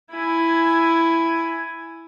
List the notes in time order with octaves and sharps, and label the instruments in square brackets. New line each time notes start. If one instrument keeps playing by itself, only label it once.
[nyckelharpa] E4 G#5